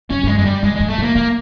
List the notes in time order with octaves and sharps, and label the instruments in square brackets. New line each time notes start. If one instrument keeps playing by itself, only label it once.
[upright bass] F#2 [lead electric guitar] C#4
[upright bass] G2 [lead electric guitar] G#3
[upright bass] F#2
[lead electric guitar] G#3
G3
[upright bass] G2 [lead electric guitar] G#3
[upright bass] G2 [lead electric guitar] G#3
[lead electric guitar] A3
[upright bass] G#2
[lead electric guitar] A#3
[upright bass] A2 [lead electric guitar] A#3